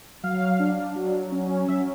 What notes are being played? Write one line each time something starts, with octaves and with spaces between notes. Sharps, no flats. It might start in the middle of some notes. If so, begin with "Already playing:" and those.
F#3 F5
D4
F#3
C#4
F#3 E5